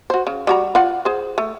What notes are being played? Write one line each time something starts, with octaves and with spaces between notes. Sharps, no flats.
F#4 C5
C#3
G3 F#4 A#5
F4 D5 F#5
G#4 C5
A3